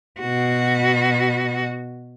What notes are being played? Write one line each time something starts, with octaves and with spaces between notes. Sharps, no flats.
B2 F#4